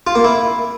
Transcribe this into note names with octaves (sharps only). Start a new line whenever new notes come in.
F4
A#3
E4